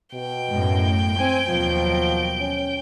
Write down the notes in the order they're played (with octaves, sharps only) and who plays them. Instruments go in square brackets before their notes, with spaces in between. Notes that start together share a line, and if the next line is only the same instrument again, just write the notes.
[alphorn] B2 [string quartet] G5
[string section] F#2 A2
[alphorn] C4 [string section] G#5
[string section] D#2 B2 F#3 [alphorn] F3
[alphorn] C#4